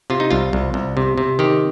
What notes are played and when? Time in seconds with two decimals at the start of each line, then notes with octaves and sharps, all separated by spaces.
0.10 C3 F4
0.20 D#4
0.31 C2 F4
0.53 C2
0.74 C2
0.97 C3
1.18 C3
1.39 D#3 G4